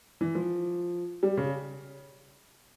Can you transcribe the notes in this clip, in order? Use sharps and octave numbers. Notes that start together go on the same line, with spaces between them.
E3
F3
G3
C#3